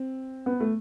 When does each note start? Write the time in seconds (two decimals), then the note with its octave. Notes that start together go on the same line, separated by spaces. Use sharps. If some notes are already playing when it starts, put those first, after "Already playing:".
Already playing: C4
0.46 B3
0.60 A3